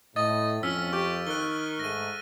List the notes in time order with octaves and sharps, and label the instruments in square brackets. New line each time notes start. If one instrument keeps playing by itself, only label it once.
[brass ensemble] A2 [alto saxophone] D#5 [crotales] A6
[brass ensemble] F2 [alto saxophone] C#4 [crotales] E6 F6 B6
[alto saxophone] G4 [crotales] C#6
[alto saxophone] D#3 [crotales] F#6 G7
[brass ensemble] G#2 A3 [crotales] A#6 D#7